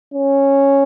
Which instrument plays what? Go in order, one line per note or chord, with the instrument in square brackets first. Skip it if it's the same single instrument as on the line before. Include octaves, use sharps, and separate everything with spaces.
[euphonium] C#4